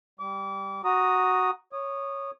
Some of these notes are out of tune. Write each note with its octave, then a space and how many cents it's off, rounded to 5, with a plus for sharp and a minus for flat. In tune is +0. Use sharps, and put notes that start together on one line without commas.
G3 +0 D6 -30
F#4 +0 A#5 +0 D#6 +0
C#5 +0 D#6 -20